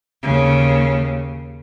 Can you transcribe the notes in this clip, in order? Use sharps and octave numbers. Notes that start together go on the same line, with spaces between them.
D#2 C#3